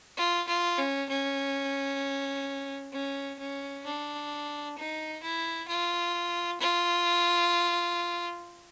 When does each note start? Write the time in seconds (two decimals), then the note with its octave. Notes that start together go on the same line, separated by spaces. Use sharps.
0.17 F4
0.47 F4
0.78 C#4
1.09 C#4
2.92 C#4
3.39 C#4
3.85 D4
4.77 D#4
5.23 E4
5.68 F4
6.60 F4